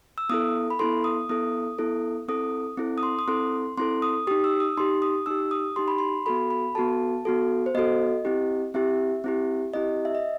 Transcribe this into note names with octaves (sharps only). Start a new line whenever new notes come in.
E6
B3 E4 A4 D#6
B5
B3 E4 A4 C6
D#6
B3 E4 A4 D#6
B3 E4 A4
C4 E4 A4 D#6
C4 E4 A4
D#6
C6
D#6
C4 E4 A4 C6
C4 E4 A4 C6
D#6
D#4 G4 D#6
E6
D#6
D#4 G4 C6
D#6
D#4 G4 E6
D#6
D#4 G4 C6
B5
C6
B3 F#4 A4 B5
B5
B3 F#4 A4 A5
B3 F#4 A4
C5
B3 F#4 A4 D#5
C4 E4 G4
C4 E4 G4 E5
C4 E4 G4
C4 E4 G4 D#5
E5
D#5